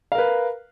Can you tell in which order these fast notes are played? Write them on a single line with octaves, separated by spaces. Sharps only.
F5 A#4 B4